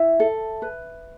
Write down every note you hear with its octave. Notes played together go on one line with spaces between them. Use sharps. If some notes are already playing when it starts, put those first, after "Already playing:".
Already playing: E4 E5
A4
B4